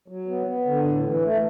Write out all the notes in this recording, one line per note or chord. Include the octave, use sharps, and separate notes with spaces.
F#3
B3
B3
D3
A2
E3
A3